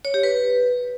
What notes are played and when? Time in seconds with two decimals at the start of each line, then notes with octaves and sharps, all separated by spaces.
0.05 C#5
0.14 G4
0.23 B4